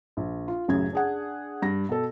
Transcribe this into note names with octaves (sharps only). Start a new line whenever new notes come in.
A#1
F4
A1 F#2 C#3 G#4 G#6
D4 G#4 F#5
G2 A#6
B2 A4